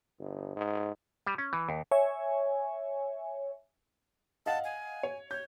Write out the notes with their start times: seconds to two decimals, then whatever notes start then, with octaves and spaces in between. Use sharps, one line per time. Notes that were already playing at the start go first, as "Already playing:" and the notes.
0.20 G1
0.56 G#2
1.26 G3
1.38 C#4
1.53 E3
1.69 D#2
1.91 C#5 E5 G#5
4.46 D#5 F5 F#5 A5
4.64 G#5
5.03 C#5
5.31 C#5 G6